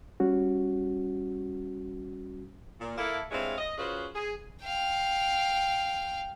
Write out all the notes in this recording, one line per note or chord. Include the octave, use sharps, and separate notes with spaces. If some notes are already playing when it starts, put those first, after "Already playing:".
G3 C#4 F#4
A#2
A#3 E4 A4
G2 G#3 C4 E4 C#5 F5
D#5
C#4 F4 F#4 G#4 B4 C5
G#4
F5 G5